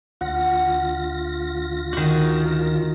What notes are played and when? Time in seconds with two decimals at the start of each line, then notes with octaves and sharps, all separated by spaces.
0.21 D2 F4 F#5 A#6
1.93 D#3 F#4